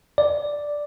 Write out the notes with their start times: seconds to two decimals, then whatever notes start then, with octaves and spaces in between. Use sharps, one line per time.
0.18 D5